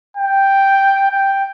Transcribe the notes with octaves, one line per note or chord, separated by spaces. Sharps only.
G5
G5